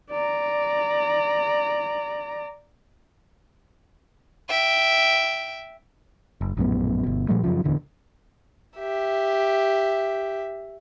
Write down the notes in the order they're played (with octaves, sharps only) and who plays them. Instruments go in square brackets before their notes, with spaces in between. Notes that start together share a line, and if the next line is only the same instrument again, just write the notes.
[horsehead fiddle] D5 A#5
[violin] E5 G5
[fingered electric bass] F#1
A#1 F#2 A2 B3
G1 B2
A#2 F3 G3 A3
F#2 A2 C#3 F3
D1 E2 D3 E3
[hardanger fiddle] G4 E5